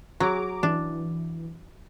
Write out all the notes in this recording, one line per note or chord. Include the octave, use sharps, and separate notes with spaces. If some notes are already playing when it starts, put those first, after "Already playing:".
F#3 G#4 A#5 D6
E3 D4